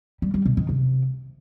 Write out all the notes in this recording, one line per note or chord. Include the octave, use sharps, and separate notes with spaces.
G3
G3
B2
D#3
C3